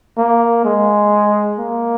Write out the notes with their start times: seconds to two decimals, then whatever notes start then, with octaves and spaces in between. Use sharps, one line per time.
0.18 A#3
0.65 G#3
1.59 A#3